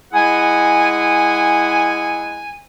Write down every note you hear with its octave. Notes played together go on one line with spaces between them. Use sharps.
G#3 E4 G#4 F#5 G#5